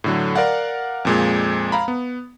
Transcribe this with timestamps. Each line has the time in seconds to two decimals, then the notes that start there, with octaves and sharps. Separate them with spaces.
0.04 A2 D3 F#3
0.36 A#4 D5 F5 F#5
1.05 F2 A#2 G#3
1.72 F5 A#5 B5
1.88 B3